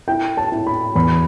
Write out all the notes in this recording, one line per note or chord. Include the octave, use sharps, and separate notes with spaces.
E4 G5
A5
E4
B5
E2 B5